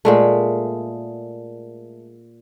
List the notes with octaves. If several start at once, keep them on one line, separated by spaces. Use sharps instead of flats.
A#2 G#3 A3